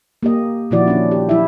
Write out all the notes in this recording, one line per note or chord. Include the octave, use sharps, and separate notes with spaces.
A#3 G4 D#5
A#2 D#3 F3 E4 F#4 D5
C#4 D4
G4
F#3 E4 E5